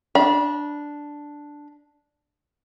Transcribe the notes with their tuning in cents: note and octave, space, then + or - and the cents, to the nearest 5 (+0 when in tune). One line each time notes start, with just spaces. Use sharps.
D4 +0 B5 -35